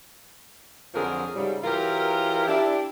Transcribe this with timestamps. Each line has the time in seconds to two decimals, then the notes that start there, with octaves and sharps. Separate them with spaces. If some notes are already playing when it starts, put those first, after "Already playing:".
0.94 F2 D3 F3 F#3 G#4 A#4
1.36 G#2 C#3 F#3 G3
1.64 E3 F#3 F4 G4 A#4
2.48 D4 E4 G4